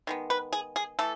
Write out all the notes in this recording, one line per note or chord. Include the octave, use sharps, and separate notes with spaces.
D#3 G#3 B3
B4
G#4
G#4
E3 A3 A4